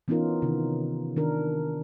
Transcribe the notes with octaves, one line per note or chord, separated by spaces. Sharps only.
E3 B3 C#4 D#4 F4 A#4
C3 D#3
D#3 D4 A#4